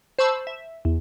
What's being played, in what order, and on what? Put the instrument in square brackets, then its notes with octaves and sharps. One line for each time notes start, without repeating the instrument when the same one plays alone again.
[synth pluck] C5 A5 B5 C#6 E6 G6
E5
E2